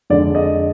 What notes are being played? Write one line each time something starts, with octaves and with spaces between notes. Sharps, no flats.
F2 D3 G#3 D5
D#5